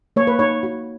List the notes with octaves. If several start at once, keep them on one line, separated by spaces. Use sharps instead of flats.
A#3 C#5
B4
D#4 C#5
F#4